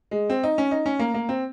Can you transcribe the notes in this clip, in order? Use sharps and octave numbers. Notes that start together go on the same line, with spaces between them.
G#3
C4
D#4
C#4
D#4
C#4
A#3
A#3
C4